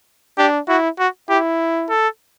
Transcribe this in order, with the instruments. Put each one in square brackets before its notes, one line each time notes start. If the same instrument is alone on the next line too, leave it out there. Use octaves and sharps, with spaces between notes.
[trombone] D4 [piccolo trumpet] G4
[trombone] E4 [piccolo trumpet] F#4
[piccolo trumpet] F#4
[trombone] E4 [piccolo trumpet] G4
[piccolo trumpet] A4